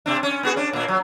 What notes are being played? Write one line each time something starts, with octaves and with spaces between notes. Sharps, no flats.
C3 C4 D4
C#4
B3 F#4 G#4
C#4 D4
A#2 A#3
F#3